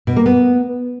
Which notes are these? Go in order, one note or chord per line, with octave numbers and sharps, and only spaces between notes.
B2
A#3
B3